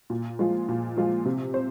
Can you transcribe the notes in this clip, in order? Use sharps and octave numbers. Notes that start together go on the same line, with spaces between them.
A#2
F3 G#3 F4
A#2
F3 G#3 F4
C3
C5